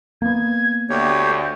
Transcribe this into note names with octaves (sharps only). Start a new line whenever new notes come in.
A#3 B3 G#6
D2 G4 C#5 G6